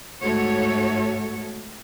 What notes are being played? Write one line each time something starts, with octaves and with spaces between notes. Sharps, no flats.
G#2 A3 F#4 A4 C#5